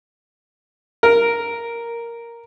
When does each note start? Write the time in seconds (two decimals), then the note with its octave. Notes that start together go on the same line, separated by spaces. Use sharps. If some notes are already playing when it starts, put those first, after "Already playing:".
1.03 A#4